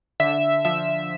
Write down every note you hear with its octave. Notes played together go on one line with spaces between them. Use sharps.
D3 E5
F3 E5